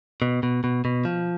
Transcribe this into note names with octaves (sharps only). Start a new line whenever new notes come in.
B2
B2
B2
B2
F3